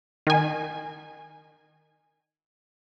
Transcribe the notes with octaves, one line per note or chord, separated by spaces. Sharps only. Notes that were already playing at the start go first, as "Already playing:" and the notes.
D#3 G#5